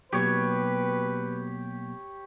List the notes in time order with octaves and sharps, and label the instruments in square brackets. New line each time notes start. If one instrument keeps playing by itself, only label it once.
[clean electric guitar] B2 F#3 A#3 [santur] G4 C#5 [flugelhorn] B4